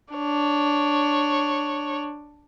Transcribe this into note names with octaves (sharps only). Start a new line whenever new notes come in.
D4 C#5